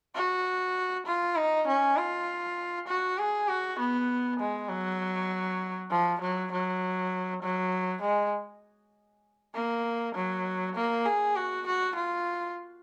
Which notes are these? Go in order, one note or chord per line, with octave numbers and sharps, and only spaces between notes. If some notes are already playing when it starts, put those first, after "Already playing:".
F#4
F4
D#4
C#4
F4
F#4
G#4
F#4
B3
G#3
F#3
F3
F#3
F#3
F#3
G#3
A#3
F#3
A#3
G#4
F#4
F#4
F4